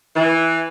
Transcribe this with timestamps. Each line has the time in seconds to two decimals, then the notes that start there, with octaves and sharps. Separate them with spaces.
0.16 E3